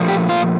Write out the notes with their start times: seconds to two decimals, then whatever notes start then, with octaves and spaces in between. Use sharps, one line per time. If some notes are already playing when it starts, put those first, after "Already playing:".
Already playing: A#2 F3 A3
0.08 G4
0.29 F4